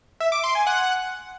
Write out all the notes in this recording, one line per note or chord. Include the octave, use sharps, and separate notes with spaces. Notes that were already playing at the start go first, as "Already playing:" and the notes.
E5
D6
C6
G#5
F#5